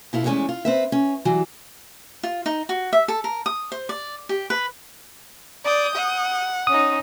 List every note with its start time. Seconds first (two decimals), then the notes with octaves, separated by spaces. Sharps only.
0.13 B2 E4 F4 A4
0.24 E2 E3 G#3 A3 C#4
0.49 F4
0.65 C4 B4 E5
0.92 C#4
1.25 E3 F#3 G3
2.23 F4
2.46 D#4
2.69 F#4
2.93 E5
3.08 A4
3.24 A#4
3.46 D#6
3.72 C5
3.89 D5
4.29 G4
4.50 B4
5.64 D5 D#6 G6
5.95 F#5
6.67 C#4 D#4 D#6